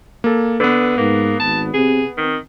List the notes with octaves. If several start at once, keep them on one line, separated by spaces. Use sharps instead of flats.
A#3 A4
D3 B3 B4
G#2 A#3
G#1 A5
C3 G#4
D#3 C4